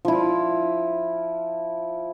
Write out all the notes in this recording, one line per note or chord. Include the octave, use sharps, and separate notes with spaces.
F3 E4